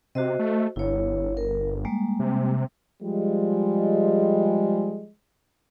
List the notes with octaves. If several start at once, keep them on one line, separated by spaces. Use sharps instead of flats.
C3 F#4 C5 D#5
A3
G1 E4 C#5
A#4
G3 G#3 A#3
C3
F3 G3 G#3